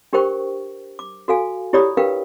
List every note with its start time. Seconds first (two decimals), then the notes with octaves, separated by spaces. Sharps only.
0.13 D4 G4 A#4 C5 G5 C#6
0.99 D6
1.28 F#4 A4 F5 G#5
1.73 E4 G4 C#5 D5 B5 D#6
1.97 D4 G4 A#4 B4 F5 G5